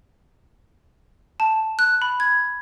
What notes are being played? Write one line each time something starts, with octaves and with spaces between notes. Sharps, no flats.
A5
F#6
B5
G#6